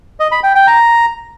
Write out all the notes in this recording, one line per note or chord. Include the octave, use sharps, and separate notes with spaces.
D#5
B5
G5
G5
A#5